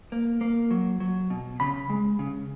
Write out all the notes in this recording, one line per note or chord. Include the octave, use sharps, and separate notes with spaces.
A#3
A#3
F#3
F#3
B2
C#3 B5
G#3
C#3